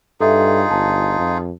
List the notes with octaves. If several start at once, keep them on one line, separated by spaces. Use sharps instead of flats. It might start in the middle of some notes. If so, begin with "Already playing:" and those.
G2 D#4 F4 G#4 A4 E5
G1 A5
F2